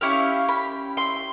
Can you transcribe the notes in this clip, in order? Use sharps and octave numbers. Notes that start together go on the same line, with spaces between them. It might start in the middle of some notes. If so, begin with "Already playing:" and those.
C#4 E4 G4 F5
B5
C6